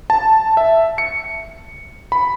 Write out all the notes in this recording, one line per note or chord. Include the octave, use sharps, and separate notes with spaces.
A5
E5
C#7
B5